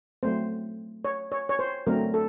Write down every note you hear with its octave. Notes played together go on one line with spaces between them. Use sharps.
F#3 A3 C4 C5
C#5
C#5
C#5
C5
D3 F#3 A3 C4 A#4
A4